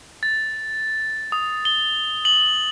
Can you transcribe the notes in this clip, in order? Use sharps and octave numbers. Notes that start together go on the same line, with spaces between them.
A6
D#6
G7
F#7